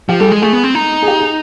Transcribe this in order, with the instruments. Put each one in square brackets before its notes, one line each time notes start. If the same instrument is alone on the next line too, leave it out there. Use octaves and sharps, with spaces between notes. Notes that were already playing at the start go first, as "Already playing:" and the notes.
[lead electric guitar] F3 [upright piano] G4
[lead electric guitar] G3 [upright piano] A4
[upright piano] G#4
[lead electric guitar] G#3
[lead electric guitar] A3 [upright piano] G#4
[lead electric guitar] B3
C4
D#4
[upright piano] G#4
G4
G#4